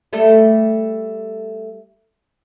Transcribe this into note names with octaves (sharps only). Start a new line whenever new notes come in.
G3 A3 A4